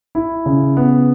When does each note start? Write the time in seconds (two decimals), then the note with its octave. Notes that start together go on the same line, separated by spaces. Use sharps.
0.15 E4
0.46 C#3
0.77 B3